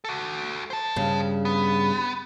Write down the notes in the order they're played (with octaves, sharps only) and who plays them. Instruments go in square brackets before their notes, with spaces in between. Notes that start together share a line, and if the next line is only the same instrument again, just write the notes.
[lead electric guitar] F#4 A4
C5 A5
[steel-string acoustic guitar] G2 C#3
[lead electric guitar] B3